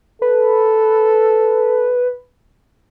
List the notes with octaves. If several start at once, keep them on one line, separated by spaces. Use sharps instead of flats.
A4 B4